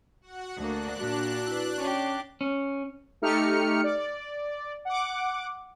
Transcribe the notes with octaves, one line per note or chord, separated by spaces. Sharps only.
F#4 F#5
D2 A#3 D4 F#6
A#2 F#4
E4 B4
C#4 D4 G4 C#5
C#4
A3 D#4 G4 F6 C#7
D5
F#5 D6